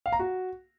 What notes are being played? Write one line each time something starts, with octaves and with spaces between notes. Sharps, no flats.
F5
A#5
F#4